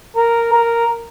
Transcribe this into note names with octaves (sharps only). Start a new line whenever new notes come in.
A#4
A#4